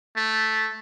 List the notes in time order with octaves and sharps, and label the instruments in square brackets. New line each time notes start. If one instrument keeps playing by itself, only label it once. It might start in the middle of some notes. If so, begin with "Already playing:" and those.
[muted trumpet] A3